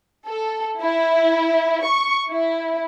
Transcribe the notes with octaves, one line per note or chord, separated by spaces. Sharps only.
A4
E4
C#6
E4